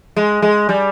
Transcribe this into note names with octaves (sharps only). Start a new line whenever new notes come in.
G#3
G#3
G3